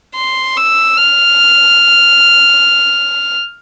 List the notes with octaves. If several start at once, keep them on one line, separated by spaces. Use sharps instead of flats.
C6
E6
F6